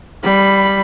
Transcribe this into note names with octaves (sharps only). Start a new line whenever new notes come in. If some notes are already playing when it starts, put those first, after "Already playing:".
G3 B5